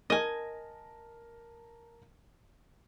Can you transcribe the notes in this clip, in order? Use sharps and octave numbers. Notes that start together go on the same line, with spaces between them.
A#4 D#5 G#5 A5